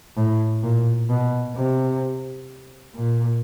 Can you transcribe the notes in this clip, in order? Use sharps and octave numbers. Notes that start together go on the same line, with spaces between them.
A2
A#2
B2
C3
A#2